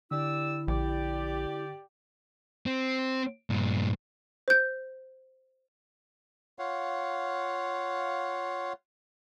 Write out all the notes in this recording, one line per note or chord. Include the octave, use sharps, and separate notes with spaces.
D3 E4 G4 D5 E6
A#1 G4 D5
C4
G2 A#2
C5 G6
F4 C#5 F5 F#5